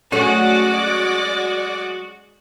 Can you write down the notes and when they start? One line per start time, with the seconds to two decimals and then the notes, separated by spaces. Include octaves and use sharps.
0.12 F#3 G#3 A3 C#4 F#4 D5 F#5